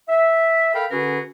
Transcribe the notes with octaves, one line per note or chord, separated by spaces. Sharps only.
E5
A4 A#4 F5 G5 B5
D3 C#4 F#4 G#4 A#4 B4